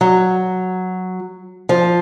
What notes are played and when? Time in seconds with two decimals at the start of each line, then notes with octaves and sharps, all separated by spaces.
0.01 F#3
1.69 F3